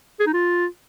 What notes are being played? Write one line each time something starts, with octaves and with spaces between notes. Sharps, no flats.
G#4
D#4
F4